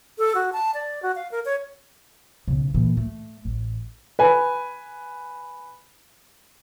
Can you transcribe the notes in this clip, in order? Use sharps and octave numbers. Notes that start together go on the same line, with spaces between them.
A4
F#4
A5
D5
F#4
F5
A#4
C#5
B1 C#3
A#2 E3
A3
A1
B4 G#5